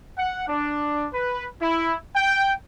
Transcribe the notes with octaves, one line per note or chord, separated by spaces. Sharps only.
F#5
D4
B4
E4
G5